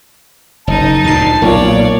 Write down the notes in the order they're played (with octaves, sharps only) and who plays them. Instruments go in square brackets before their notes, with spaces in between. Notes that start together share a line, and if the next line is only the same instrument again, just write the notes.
[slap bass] F#1 [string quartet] D#4 [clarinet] A5
[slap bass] D2 A#2 [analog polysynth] A6 C7
[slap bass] B1 [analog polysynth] A#2 [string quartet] C#5 D5